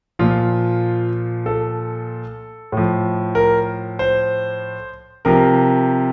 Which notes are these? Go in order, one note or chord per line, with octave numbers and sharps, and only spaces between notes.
A#2 F3 F4
A4
A2 F3
A#4
C5
C3 F3 A#4